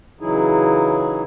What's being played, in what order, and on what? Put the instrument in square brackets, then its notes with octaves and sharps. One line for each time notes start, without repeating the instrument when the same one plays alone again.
[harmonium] C#3 E3 F#3 D#4 E4 G#4